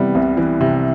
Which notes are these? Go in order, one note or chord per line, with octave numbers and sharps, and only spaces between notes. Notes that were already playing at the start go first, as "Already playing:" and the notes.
Already playing: C3 E3 G3 B3
C2
E3
C3